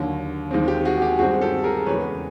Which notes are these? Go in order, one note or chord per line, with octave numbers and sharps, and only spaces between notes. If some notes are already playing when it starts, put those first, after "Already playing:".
Already playing: D#2 D3 F#3
D#2 D#3 G#3 C4
G4
F#4 G#4
G4
G2 D#3 G#3 C4 F#4 G#4
G4 A4
G#4 A#4
E2 C#3 E3 G#3 B4 C#5